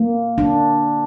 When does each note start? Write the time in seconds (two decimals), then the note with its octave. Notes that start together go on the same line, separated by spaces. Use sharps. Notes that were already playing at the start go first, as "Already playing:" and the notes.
Already playing: A#3
0.38 D4